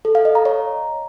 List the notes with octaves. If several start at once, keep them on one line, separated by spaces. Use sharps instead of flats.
A4
F5
D#5
A#5
C#5